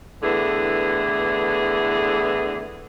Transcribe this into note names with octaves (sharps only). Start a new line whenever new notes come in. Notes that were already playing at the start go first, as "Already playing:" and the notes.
A2 D3 E3 B3 G#4